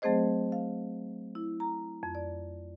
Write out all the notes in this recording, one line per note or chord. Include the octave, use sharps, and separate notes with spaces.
F#3 A3 C4 G#4 C5 D#5
F5
E4
A#5
F2
D5